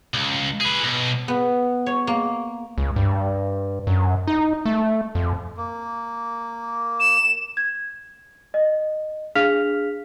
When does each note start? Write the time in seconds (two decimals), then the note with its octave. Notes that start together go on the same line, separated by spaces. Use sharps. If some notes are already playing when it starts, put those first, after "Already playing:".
0.14 C#2
0.60 G#4 B4
0.84 B1
1.28 B3
1.86 C#5
2.07 A#3
2.78 C#2
2.96 G2
3.87 F#2
4.28 D#4
4.65 A3
5.15 F2
5.57 A#3
7.00 E7
7.57 G#6
8.54 D#5
9.35 D4 G#4 F5 F6 B6 F7